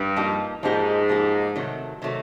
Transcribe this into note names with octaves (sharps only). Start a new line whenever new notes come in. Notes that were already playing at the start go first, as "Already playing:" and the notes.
Already playing: G2
F3 A#3 D#4 G4
G#2 F3 A#3 D#4 G4
F3 A#3 D#4 G4
C3 D#3 F#3 A3
C3 D#3 F#3 A3